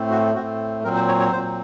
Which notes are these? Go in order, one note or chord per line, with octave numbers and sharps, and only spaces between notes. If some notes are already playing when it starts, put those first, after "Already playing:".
Already playing: A2 A3 C4
F#4
A2 A3 C4 F#4
A#2 F#3 C4 A#4
C5
C#5
C#5
A#2 F#3 C4 C5